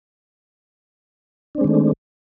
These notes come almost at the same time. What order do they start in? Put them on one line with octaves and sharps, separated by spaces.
D4 C4 G#3 D#3 A3